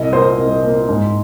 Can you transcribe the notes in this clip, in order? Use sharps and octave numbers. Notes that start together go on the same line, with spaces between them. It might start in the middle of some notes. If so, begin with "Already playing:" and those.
Already playing: C2 D#5
A#2 A#3 C5
C2
A#2 A#3
G#2